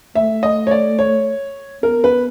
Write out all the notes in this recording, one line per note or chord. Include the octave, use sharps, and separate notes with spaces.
A3 E5
D#5
C#5
D5
C#5
B3 A#4
B4